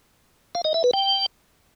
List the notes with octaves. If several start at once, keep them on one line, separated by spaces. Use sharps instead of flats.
F5
D#5
E5
B4
G5